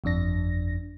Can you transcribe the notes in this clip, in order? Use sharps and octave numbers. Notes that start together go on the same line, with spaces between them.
G1 F2 D4 A#6